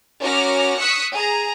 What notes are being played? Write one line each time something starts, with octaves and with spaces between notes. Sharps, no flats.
C#4 F#4 A#4 D6 F6 A#6
C#6 D#6 E6 F#6 B6 C#7
G#4 A#5